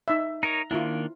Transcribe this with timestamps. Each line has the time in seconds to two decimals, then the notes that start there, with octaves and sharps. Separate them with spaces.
0.08 D#4 E5
0.43 D#4 A#4 C#5 A#5
0.71 D#3 A#3 D4 E4 F4